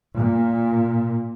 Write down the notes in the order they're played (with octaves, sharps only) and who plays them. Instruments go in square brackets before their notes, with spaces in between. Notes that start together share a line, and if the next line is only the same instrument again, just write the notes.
[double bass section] A#2